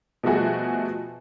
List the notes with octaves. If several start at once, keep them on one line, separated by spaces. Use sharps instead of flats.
B2 F3 G3 A3 F#4 G#4